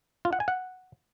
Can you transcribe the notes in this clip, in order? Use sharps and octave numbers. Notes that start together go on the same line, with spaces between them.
F4
F#5
G#5
F#5